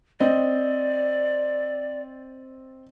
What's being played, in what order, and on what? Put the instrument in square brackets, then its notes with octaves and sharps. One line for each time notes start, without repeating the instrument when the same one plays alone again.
[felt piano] C4 D#5 [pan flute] D5